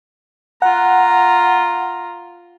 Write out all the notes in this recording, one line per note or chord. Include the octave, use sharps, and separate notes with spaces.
F4 F#5 A#5